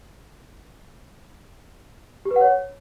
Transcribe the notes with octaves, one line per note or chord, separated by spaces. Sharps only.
G4
B4
F#5
C#5